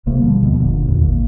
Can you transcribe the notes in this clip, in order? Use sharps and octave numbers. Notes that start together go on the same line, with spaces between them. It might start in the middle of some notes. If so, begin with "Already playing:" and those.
D#1 A#1 C3 A#3
B2 D3 F3 G3
D2 B2
F#1 A#2 D3
F1 D#2 A#2 D3
G#1 D#3 A#3